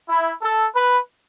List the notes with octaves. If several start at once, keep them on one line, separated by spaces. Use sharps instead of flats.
E4
A4
B4